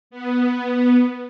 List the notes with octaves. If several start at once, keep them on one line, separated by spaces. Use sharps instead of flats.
B3